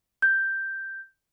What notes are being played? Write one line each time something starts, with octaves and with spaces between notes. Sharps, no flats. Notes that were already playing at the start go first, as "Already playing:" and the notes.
G6